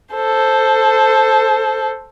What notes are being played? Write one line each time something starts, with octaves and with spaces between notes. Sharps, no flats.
A4 C5